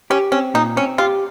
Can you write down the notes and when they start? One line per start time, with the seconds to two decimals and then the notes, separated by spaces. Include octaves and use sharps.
0.10 C#4 G4
0.32 C4 C#4
0.54 A#2 D#4
0.76 C4 C#4
0.98 F4 G4